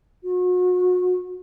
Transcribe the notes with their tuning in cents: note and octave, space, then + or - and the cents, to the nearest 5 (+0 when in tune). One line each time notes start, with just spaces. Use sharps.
F#4 -35